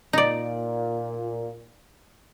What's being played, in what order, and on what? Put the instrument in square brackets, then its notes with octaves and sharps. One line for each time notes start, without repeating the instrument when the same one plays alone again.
[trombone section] A#2 [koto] D#4 D5